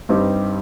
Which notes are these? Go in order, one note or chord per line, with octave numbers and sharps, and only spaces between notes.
G2 G3 C4 D#4 G4